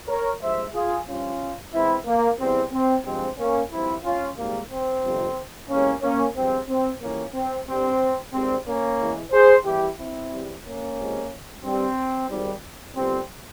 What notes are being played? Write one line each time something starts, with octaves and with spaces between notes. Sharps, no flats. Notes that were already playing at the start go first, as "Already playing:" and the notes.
A#4 C#5
G2 F3 G#3 C5 E5
F4 G#4
G1 G2 F3 C#4 F4
E2 E3 G#3 C4 E4
A#3
E2 E3 G3 C4
C4
G2 F3 G#3 C4
A#3 C#4
G#1 G2 F3 C4 E4
C#4 F4
G#1 G#2 G3 A#3
C4
G1 F2 C3
E2 C3 E3 G#3 A#3 C#4
A#3 C#4
G1 G2 F3 G#3 C4
C4
F2 E3 G3 A#3 C#4
C4
G1 G2 G3 C4
G#1 G2 G3 C4
A#3 C#4
E2 E3 G#3
G#4 C5
E2 E3 G3 E4 G4
C4 E4
E2 C3 E3 G3
A#3 C#4
C#2 C3 F3 G#3
G2 G3 C4
G#1 G#2 G3
G1 G2 G3 C4